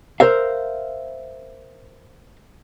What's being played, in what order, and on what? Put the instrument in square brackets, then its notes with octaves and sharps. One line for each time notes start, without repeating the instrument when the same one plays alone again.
[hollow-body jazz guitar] A#4 C5 E5 F5